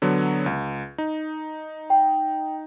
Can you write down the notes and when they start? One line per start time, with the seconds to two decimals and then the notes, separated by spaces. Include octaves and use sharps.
0.02 D3 F#3 B3
0.46 C#2
0.98 D#4
1.90 G5